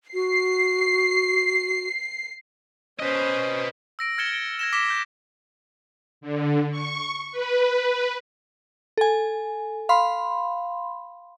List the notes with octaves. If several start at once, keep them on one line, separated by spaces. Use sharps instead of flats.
F#4 C7
C#4 B4 C5 D#5
E6 A#6 D7
F6 G#6 A6 C#7 E7 G7
D7
G#6 A#6 E7
D6 A#6 B6 E7 G7
G6
D3
C#6
B4
A4 G#5
F5 B5 C6